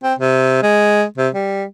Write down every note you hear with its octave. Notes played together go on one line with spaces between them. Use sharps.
C4
C3
G#3
C3
G3